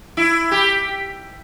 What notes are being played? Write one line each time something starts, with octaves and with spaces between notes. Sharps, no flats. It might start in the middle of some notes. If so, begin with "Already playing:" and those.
E4
G4